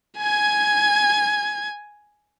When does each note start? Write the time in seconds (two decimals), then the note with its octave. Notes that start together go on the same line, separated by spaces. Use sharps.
0.18 G#5 G#6